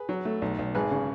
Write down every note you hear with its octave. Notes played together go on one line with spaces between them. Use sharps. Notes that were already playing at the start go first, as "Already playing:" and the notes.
Already playing: G#4 B4
F#3
A3
B1
B1
G#1 G#4 B4
C#3